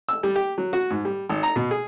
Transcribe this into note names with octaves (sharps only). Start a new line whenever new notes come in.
E6
G3
G4
F#3
F#4
G#2
G3
G#1
A#5
B2
G#4